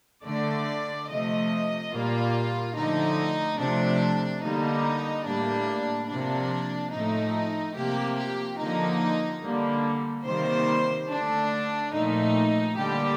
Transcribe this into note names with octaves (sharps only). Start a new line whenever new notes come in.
D3 A3 D5
C3 F3 A3 D#5
A#2 G3 A#3 F4
D3 F3 A3 D#4
C3 F3 A3 D4
D3 G3 A#3 D#4
A2 G3 A#3 D4
C3 F3 A#3 D4
A2 F3 A3 D#4
C3 F3 A#3 G4
G4
D3 F3 A#3 D#4
D3 G3 A#3
C3 D#3 G3 A#3 C5
D3 A3 D4
A#2 F3 A3 D#4
D3 G3 A#3 G4